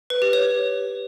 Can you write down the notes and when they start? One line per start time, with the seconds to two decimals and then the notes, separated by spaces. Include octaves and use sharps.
0.10 B4
0.22 G4
0.33 C#5